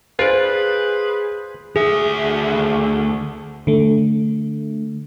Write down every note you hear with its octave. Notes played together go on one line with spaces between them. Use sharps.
F4 G#4 B4 C5 D5
D2 G#4 E5
D3 A3